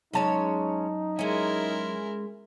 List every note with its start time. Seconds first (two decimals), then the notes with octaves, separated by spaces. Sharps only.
0.13 F#2 G#3 C#4 D#4 C#5 A5
1.19 G#3 C#4 E4 A#4